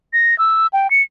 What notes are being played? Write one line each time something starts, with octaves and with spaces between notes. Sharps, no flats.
A#6
E6
G5
C#7